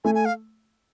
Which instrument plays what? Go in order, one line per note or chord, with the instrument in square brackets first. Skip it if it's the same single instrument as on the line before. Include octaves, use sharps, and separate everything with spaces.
[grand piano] A3 [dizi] G#5
[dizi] G#5
F5